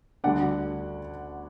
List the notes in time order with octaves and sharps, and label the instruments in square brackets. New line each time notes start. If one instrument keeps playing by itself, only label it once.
[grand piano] D2 D3 G3 D4 D5 F#5